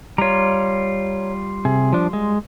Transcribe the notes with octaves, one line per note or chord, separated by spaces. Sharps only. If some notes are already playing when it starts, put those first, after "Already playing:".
G3 F4 C#5 A#5
C3 G#4
F3 D4
G#3